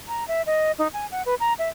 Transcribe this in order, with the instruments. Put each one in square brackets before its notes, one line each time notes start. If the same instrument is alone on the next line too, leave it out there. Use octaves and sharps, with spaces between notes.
[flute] A#5
E5
D#5
D#4
G#5
F#5
B4
A#5
E5